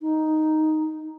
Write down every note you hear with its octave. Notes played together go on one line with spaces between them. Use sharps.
D#4